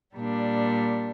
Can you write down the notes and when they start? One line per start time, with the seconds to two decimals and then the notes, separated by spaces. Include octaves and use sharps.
0.14 A#2 G3 D4